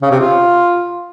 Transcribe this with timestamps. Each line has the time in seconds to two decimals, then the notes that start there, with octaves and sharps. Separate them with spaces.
0.02 C#3
0.11 C3
0.20 F4